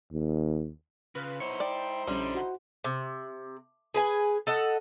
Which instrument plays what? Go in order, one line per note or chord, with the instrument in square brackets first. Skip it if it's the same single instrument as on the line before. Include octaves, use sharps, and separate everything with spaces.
[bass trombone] D#2
[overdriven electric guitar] C#3 [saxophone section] F4 B4
[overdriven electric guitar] B3 C#5 [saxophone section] D#4 E4 C5 [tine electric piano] C#7
[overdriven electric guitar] G#3 G5 [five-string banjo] D5
[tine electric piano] A#1 C#4 [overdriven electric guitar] D3 [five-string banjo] G3
[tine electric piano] F#4 F#5
[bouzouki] C3
G#4 B4 G#5
A4 D#5 F#5